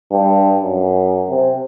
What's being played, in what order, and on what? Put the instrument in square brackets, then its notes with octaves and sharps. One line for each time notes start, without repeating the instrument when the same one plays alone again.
[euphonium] G2
F#2
C3